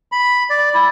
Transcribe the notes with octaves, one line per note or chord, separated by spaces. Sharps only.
B5
D5
E4